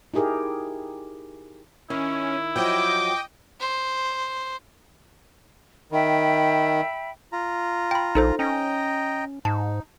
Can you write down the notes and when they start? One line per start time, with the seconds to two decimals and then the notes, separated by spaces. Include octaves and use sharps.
0.14 D#4 E4 G4 G#4 A#4
1.90 D#3 C#4 E4
2.56 F3 F#3 D#5 G5 D6
3.60 C5
5.92 D#3 E5 G5 B5
7.32 F4 A#5
7.91 G5 B5
8.15 A#1 D#4 A4 C5
8.39 C#4 D#5 G5 A#5
9.45 G#2 D#4 A5